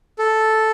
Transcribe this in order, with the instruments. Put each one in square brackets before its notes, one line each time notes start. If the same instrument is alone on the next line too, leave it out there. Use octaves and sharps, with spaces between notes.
[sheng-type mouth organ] A4